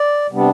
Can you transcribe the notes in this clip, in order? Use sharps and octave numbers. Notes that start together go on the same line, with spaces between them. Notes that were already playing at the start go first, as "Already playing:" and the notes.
Already playing: D5
C3 G3 B3 D4